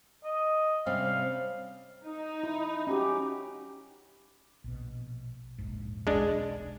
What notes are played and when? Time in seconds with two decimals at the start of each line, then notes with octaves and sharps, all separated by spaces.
0.24 D#5
0.86 C3 G3 C#4 F5
2.04 D#4
2.43 E4
2.87 C#4 F#4 G4
4.64 A#1 B2
5.58 E1 A#1 G#2
6.07 E1 B1 G#3 D4